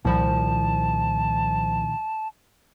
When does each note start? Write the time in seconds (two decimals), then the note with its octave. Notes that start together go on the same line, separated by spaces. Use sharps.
0.05 C2 A#2 D#3 F3 A5 B5